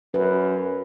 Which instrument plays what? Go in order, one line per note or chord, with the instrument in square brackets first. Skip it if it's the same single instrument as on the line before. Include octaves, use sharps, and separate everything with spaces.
[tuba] F#2 [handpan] B4